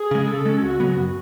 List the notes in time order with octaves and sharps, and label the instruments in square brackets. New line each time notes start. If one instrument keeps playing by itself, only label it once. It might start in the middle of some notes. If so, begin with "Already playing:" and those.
Already playing: [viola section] G#4
[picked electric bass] C#3 G#3
[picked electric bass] C#3 [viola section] A4
[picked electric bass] G#3 C#4
[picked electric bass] C#2 [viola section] F#4
[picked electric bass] C#3 F#3 B3
F#2